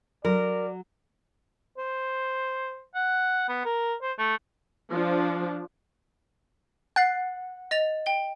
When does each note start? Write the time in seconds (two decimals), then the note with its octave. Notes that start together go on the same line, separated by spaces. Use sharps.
0.25 F#3 A#4 D5
1.78 C5
2.94 F#5
3.49 B3
3.65 A#4
4.02 C5
4.18 A3
4.92 F3 D4
6.96 F#5 F#6 A6 C7
7.71 D#5 A6 F7
8.06 G5 G7